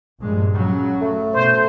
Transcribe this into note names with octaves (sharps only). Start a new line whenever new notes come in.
A#1 G2 G#3
C#3 F#3
A3
B2 C5